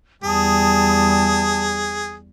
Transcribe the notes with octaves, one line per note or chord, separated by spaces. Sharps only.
E2 G3 G#4 A5 D#6